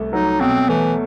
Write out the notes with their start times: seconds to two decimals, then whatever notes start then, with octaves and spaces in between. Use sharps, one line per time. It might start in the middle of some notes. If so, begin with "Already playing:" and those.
Already playing: C2 A3
0.12 F#3 D#4
0.40 B2 C4
0.69 E3 A3